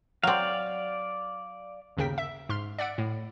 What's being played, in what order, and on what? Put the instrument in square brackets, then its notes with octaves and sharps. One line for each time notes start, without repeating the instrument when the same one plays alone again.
[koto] F#3 C4 [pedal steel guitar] D5 F5
[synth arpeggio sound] G1 D#2 C#3 A#4 G5 B6
E5
G#2 C6 F6
D5 E5 F#5 D7
A2